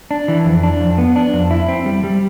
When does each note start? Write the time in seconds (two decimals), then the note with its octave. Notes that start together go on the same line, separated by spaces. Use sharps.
0.11 D4
0.28 E3
0.46 F2
0.63 D4
0.81 F2
0.98 B3
1.16 D4
1.33 F2
1.51 E4
1.68 C4
1.86 G3
2.04 G3